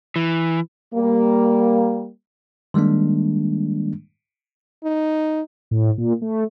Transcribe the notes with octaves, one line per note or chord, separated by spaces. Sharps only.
E3
G3 A#3
D#3 G3 G#3 A#3 D4
D#4
A2
A#2
A3